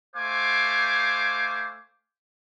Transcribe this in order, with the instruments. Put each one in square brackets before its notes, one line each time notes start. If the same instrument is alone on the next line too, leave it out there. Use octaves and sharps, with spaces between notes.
[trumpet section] A3 C5 F5 G#5 D6